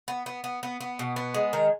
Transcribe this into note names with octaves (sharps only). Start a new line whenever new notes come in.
B3
B3
B3
B3
B3
B2
B3
G#3
D#3 A#4